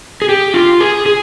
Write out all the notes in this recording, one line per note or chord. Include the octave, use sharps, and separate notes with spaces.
G#4
G4
F4
G#4
G#4